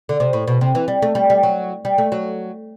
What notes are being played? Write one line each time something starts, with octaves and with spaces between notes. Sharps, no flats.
D3
C3
A2
B2
C3
E3
G3
A3
G3
G3
F#3
G3
A3
F#3